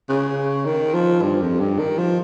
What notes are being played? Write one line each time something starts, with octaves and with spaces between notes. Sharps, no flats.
C#3
D#3
F3
G2
F2
G2
D#3
F3